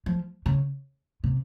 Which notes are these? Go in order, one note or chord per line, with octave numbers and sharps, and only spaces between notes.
F3
C#3
C3